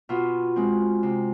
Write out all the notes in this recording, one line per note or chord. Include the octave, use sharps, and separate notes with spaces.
B2 F4
G#3 C4
C3